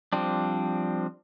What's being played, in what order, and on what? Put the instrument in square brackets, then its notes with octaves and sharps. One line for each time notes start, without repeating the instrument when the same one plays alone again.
[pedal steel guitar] F3 G3 C4 D4